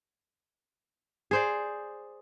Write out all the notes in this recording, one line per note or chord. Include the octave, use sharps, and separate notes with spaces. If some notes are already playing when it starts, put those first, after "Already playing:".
G#4 C5 D5